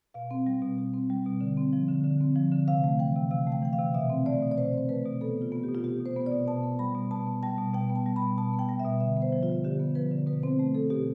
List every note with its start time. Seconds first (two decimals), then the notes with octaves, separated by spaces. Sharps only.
0.14 B2 F5
0.31 C4
0.47 G3
0.62 B2
0.78 B2
0.94 C4
1.10 G3
1.26 B2
1.41 D3
1.57 C4
1.73 F3
1.89 D3
2.04 D3
2.21 C4
2.36 F3
2.52 D3
2.68 C3 F5
2.84 A3
2.99 E3 G5
3.16 C3
3.31 C3 F5
3.47 A3
3.52 G5
3.62 E3 G5
3.73 F5
3.78 C3
3.94 B2 E5
4.10 C4
4.26 A3 D5
4.42 B2
4.51 D5
4.57 B2 C5
4.74 C4 C5
4.89 A3 B4
5.06 B2
5.21 B3 A4
5.37 B2
5.42 F4
5.52 B3
5.63 G4
5.69 B2
5.75 F4
5.84 B3 G4
6.00 B2
6.06 C5
6.16 B3
6.26 D5
6.32 B2
6.48 B2 A5
6.63 B3
6.79 G3 B5
6.95 B2
7.11 B2 A5
7.27 B3
7.43 G3 A5
7.58 B2
7.74 B2 G5
7.90 B3
7.96 A5
8.06 G3
8.16 B5
8.22 B2
8.37 B2 A5
8.54 B3
8.59 G5
8.69 G3
8.80 E5
8.85 B2
9.00 D3 E5
9.17 B3
9.22 C5
9.32 F3
9.43 F4
9.49 D3
9.64 D3 G4
9.80 B3
9.95 F3 B4
10.11 D3
10.27 B2 B4
10.43 C4 C5
10.59 A3
10.75 B2 A4
10.90 B2 G4